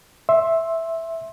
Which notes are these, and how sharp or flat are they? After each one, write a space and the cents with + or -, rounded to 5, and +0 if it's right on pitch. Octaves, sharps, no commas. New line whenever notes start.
E5 +0 C6 +20